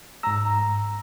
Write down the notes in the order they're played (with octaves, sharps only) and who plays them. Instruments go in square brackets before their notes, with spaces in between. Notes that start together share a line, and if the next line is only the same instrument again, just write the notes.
[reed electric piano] G#2 E6 [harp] A#5